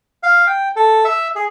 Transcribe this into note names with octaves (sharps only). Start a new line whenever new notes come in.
F5
G5
A4
E5
G#4